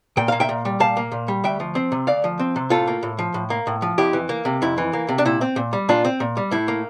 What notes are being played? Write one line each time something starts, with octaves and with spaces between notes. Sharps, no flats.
A#2 G5
A#3 F5
E5 G5
A#2
G3
A#2 F5 A5
A#3
A#2
G3
D2 E5 G5
F3
C4
C3
D2 D5 F5
F3
C4
C3
A2 F4 A4
A#3
A2
F3
A2
A#3
A2
F3
F2 E4 G4
E3
A#3
C3
F2 E4
E3
A#3
C3
D4
A#2 E4
C4
A#2
G3
A#2 D4 F4
C4
A#2
G3
A2 E4
A#3